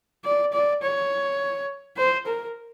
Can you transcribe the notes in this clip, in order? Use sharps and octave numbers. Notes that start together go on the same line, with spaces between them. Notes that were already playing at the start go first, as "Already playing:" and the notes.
D5
D5
C#5
C5
A#4